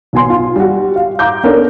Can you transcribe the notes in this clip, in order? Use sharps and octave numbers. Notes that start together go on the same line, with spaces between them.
B1 F#3 B3 G#5 C6
F4
G3 F#4
F5
F5 A#5 D6 G6
B3 C#4 D4 A4 A#4